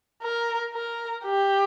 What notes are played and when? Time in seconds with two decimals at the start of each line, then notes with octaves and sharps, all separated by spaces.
0.23 A#4
0.74 A#4
1.25 G4